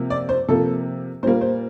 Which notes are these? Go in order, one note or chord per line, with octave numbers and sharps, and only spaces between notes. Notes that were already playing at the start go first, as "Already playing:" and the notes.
Already playing: C3 F3 A#3
D5
C5
C3 F3 A#3 A4
A#2 G3 A#3 C5
C5